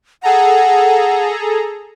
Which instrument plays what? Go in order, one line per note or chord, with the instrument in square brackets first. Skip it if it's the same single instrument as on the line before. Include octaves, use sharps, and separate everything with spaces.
[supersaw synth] G#4 A4 A#5 [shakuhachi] F#5